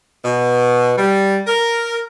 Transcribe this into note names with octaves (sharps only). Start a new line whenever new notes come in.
B2
G3
A#4